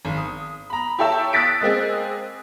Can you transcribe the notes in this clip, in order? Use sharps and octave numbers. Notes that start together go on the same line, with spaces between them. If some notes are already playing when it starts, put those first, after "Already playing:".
G#1
D#6
A#5 B5
E4 G4 A4 C#5 E5 A5
D#6 E6 F#6 A6 B6 D7
G#3 A#3 C4 G#4